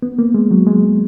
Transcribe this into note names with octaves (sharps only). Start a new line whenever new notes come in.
B3
A#3
G#3
F#3
G#3